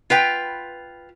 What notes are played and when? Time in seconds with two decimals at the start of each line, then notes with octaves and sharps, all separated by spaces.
0.10 F4 B4 G5